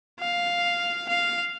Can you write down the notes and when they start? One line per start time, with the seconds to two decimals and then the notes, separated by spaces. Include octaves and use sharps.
0.20 F5
1.09 F5